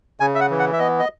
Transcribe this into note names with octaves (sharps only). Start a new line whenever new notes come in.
C#3 G#5
E5
F#5
E3
F#5
E5
B3 D#5
D#5